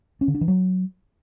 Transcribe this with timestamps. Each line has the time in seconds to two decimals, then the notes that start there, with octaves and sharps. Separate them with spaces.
0.21 C#4
0.28 D3
0.35 D4
0.41 E3
0.48 F#3